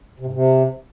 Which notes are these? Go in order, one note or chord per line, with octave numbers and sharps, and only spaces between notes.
C3
G#2
C3